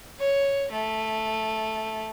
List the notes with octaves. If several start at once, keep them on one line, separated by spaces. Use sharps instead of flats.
C#5
A3